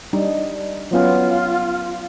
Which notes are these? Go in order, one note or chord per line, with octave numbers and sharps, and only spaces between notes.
G3 D4 D#4
F#3 B3 C#4 F4